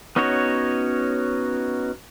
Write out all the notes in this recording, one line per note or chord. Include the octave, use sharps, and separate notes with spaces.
B3 C#4 D#4 F#4 C#5